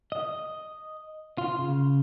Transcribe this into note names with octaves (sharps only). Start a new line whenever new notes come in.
D#5
F4
C#3